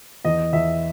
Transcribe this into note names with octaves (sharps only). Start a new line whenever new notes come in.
E2 D#5
E2 E5